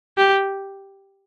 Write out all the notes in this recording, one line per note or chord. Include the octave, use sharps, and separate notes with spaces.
G4